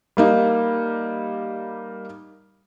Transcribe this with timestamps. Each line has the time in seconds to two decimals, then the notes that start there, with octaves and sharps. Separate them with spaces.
0.17 G3 A#3 D#4